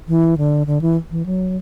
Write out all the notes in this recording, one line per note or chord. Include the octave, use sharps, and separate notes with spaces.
E3
D3
D3
E3
E3
F#3